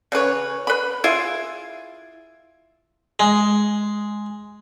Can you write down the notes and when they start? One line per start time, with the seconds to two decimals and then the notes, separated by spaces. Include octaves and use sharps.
0.12 C#3 E3 B4 C#5
0.67 B4 B5
1.04 E4 F4 G#4 E5
3.20 G#3